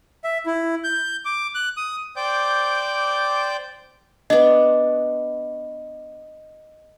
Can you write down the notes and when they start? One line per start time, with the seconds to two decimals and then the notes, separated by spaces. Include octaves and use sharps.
0.24 E5
0.46 E4
0.84 G6
1.25 D6
1.55 F#6
1.77 D#6
2.16 C5 D5 G5 D6 G6
4.30 B3 D4 D#5